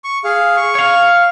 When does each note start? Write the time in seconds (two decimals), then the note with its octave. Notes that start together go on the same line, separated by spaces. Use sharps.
0.04 C#6
0.24 G#4 F5
0.57 C#6
0.75 C#5 F5